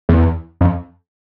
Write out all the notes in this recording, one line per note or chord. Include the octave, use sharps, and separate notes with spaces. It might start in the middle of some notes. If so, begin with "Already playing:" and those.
E2
F2